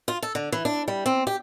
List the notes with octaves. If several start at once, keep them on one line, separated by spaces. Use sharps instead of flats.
F4
A4
D3
E3
D4
G3
C4
G4